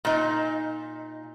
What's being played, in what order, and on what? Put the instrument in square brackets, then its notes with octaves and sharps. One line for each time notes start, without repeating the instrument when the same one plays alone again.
[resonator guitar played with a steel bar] A#2 D#4